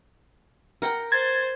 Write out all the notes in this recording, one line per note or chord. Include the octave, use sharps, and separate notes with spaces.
A#4 F#5 G5
C5 G#6 A6